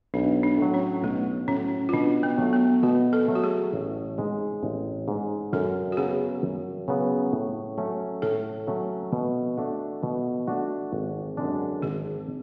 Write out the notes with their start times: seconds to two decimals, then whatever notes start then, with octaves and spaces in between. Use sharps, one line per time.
0.14 B1 D4
0.43 D4
0.58 A2 F#3
0.74 C#4
1.03 B1 A3
1.48 A2 F#3 C#4
1.89 F4
1.93 B2 D4
2.23 B3
2.38 F#3 A3
2.53 B3
2.83 B2 F#4
3.13 A4
3.28 F#3 A3
3.35 F#4
3.44 G#4
3.74 A1
4.18 G#2 G#3
4.63 A1
5.08 G#2 G#3
5.53 F#2 A4
5.92 F#4
5.97 C#3 F#3 B3 G#4
6.43 F#2
6.88 C#3 F#3 B3
7.33 A2
7.78 F#3 A3 C#4
8.22 A2 A4
8.67 F#3 A3 C#4
9.13 B2
9.58 A3 D4 F#4
10.03 B2
10.47 A3 D4 F#4
10.93 G#1
11.37 F#2 D3 G#3 D4
11.82 G#1 G#4